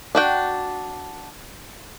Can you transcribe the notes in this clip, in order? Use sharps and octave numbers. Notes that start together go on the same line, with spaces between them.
D4 F#4 G5